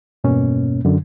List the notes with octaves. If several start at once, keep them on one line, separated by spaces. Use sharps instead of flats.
E2 G2 B2 A#3 C#4
F#2 D3